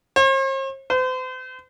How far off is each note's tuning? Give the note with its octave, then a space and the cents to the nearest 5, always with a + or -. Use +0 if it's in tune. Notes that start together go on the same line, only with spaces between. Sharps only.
C5 +45
C5 -40